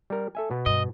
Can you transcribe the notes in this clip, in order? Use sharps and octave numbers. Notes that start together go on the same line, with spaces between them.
G3 A#4
A4 E5 G#5
B2 B3
G2 D#5